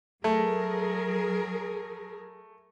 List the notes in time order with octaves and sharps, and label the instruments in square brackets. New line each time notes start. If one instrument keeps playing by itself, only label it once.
[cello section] F#3 G#4 A#4 [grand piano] A3